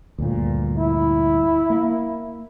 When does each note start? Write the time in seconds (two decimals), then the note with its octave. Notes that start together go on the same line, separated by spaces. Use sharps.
0.18 D2 G2 A#2
0.78 E4
1.70 A#3